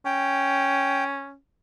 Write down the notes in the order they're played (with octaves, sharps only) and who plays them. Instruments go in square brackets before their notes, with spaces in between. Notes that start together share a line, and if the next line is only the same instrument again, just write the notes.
[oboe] C#4 [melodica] G5